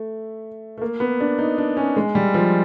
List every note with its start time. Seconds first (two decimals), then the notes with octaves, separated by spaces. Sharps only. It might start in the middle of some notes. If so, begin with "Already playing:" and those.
Already playing: A3
0.77 A3
0.81 A#3
1.00 B3
1.20 D4
1.38 D#4
1.58 D4
1.77 C#4
1.96 G#3
2.15 G3
2.34 F3